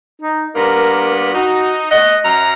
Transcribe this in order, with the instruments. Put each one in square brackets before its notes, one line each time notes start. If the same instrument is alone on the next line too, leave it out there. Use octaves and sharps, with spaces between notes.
[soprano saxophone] D#4
[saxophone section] G2 A#3 B3 [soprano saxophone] A#4
[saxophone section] D#4 [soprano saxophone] F#4
[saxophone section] A3 F#5 [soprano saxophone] D#5
[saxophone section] F#2 [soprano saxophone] A#5